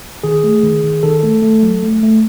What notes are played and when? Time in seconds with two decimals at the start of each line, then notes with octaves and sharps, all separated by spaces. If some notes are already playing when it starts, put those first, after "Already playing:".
0.23 D#3 G#4
0.44 A3
0.63 D#3
0.84 D#3
1.03 D#3 A4
1.23 A3
1.43 A3
1.63 F#3
1.83 A3
2.03 A3